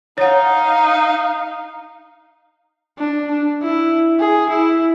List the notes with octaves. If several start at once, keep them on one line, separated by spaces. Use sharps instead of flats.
D#4 C#5 F5 F#5
D4
D4
E4
G#4
E4